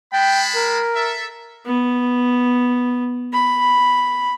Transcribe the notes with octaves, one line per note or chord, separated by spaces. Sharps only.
G#3 G5 A5 B5
A#4
A4 E5
B3
B5